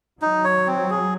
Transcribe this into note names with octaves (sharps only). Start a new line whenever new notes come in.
F#3 D#4
C#5
C4
G#4